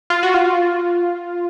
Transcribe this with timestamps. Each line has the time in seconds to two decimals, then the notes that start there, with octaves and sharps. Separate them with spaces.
0.10 F4
0.23 F#4
0.34 F4